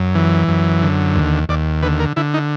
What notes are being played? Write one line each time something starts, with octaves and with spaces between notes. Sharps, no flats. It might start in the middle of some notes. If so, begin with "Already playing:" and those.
Already playing: F#2
E3
F#2
D3
D#2
D#2 D5
D3 B4
A#4
D3 E4
D#4